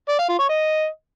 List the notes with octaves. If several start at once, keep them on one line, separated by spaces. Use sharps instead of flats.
D5
F5
F4
C#5
D#5